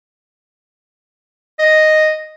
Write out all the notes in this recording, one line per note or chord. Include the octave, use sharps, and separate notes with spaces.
D#5